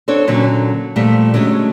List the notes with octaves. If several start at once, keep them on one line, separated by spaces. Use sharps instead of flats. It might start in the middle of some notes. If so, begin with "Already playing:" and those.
C4 D4 A4 C#5
A#2 D3 F#3 C#4
A#2 F3 G3 A3
D3 F#3 G#3 A3 C#4